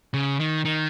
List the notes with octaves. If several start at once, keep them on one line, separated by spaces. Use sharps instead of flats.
C#3
D#3
D#3